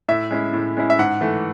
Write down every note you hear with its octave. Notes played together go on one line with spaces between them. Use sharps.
A2 E5
G#3 C#4 E4
A2
G#3 C#4 E4
E5
G#2 F#5
E3 A3